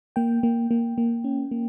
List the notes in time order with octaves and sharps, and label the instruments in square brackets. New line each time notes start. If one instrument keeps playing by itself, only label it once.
[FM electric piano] A#3 G5
A#3
A#3
A#3
C#4
A#3